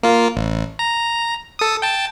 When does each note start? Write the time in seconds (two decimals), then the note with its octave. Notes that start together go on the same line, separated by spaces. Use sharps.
0.03 A#3 F4
0.36 A1
0.79 A#5
1.59 A4 D#6
1.82 G5 A5